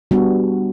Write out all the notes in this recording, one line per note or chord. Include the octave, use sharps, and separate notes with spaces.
G3 B3 D4 F#4